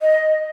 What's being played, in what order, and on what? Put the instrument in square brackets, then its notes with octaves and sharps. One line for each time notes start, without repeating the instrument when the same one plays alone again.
[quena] D#5